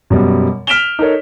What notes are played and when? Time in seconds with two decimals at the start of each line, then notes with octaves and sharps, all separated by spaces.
0.10 F#2 B2 G3
0.67 F6 B6 D7 E7 F7 G7
0.99 D#4 A4 A#4 C#5